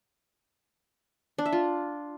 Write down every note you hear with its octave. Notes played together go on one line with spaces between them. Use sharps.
D4
E5
F4